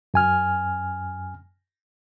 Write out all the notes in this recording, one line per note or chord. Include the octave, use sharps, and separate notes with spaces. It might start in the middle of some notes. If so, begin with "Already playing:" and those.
F#2 G#5 F6